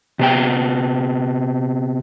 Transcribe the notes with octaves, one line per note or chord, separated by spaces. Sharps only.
C3 B3 G5